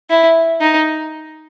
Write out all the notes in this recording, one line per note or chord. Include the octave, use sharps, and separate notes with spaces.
E4
D#4